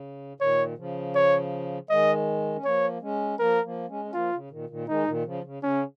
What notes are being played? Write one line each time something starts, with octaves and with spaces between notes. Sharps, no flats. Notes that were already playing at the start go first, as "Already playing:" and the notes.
Already playing: C#3
A#2 D#3 C#5
C#3 F3
C#5
D#3 G#3 D#5
C#4
F3 A#3 C#5
G#3 C#4
F3 A#3 A#4
F3 A#3
G#3 C#4
C#4
F3 A#3 F4
C#3
A#2 D#3
A#2 D#3
D#3 G#3 D#4
A#2 D#3
C#3 F3
C#3
C#3 C#4